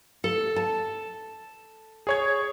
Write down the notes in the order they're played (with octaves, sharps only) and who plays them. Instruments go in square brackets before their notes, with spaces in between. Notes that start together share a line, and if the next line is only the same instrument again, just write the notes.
[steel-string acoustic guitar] A4
A5
[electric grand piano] G#4 C#5 G#6